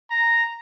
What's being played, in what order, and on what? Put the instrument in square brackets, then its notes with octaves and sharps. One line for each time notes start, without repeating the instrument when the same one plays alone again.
[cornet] A#5